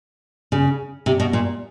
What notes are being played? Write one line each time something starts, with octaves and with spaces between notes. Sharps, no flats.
C#3
C3
B2
A#2